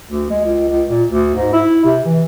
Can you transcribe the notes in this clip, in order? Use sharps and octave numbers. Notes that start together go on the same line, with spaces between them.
D2
G#3
C#2
C#2
A#2
D2
G#2
E4
C3
E3